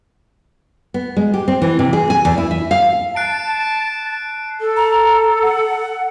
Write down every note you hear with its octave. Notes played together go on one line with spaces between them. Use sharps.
B3
G#3
G4
C4
E3
C3
G#4
G#5
E2
E4
E5
F5
A5 F#6 C7 D7
A4
A#5
F#5